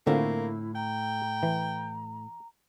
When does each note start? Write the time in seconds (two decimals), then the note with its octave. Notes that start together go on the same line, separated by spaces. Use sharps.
0.07 A2 D3 A3 A#3 C4 E4 F4
0.75 G5 A#5
1.43 E3